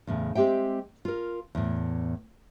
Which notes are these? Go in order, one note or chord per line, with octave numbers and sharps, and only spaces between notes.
E2 A2 C#3
G#3 C4 G4 E5 G5
F4 A#4
E2 A2